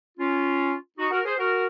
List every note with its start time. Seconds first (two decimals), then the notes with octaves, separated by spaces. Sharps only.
0.18 C#4 F4
0.98 D#4 F#4
1.11 F#4 A#4
1.25 G#4 C5
1.38 F#4 A#4